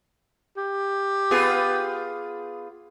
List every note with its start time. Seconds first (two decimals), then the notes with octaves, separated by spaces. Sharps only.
0.57 G4
1.31 B3 F4 G#4